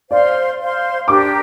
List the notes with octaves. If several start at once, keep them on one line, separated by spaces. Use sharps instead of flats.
C5 D5 F5 C6
C5 F5 C6
D4 G4 A#4 D6